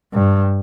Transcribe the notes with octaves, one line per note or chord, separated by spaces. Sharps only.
G2